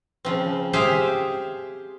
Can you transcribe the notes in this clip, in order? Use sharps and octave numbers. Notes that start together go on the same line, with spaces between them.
C#3 F3 C4
G4 G#4 C5 E5 F5